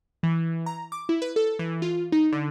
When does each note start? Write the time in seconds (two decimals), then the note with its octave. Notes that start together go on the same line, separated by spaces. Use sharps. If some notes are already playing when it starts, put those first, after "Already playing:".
0.23 E3
0.66 A#5
0.92 D6
1.09 E4
1.22 B4
1.36 A4
1.59 E3
1.82 F4
2.12 D#4
2.32 D3